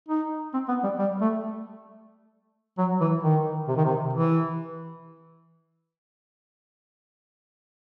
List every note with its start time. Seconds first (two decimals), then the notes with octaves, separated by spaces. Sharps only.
0.09 D#4
0.54 C4
0.69 B3
0.84 G3
0.99 G3
1.21 A3
2.78 F#3
3.01 E3
3.23 D#3
3.68 C3
3.77 D#3
3.85 C3
4.13 E3